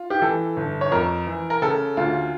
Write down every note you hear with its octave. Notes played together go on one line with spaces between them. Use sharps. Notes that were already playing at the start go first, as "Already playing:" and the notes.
Already playing: F4
G4
E3 A4
G1
C#5
F2 A#4
E3
A#4
C#3 A4
D2 F4